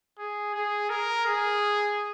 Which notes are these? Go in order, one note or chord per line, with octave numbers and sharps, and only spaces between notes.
G#4
G#4
A#4
G#4